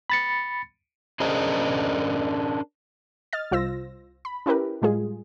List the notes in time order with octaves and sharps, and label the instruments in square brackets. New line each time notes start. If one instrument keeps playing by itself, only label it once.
[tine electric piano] B5 A6 C#7
[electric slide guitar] C#4 D4 G#4 A#4 C5 D#5
[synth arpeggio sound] D#5 F6 A6
C2 F4 C5 E6 A#6
B5
C#4 E4 G4 A#4 B4
A2 G3 G#3 F4 G#4